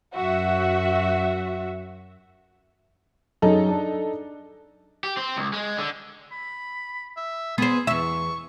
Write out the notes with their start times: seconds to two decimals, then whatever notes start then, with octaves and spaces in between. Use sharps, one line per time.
0.15 F#2 F#4 E5
3.42 F#2 C#4 D#4 G#4 A4
3.69 D4
5.04 G4
5.17 C4
5.36 C#2
5.53 G#3
5.78 D3
6.32 B5
7.17 E5
7.58 B3 G#4 C5
7.87 E2 E5 C#6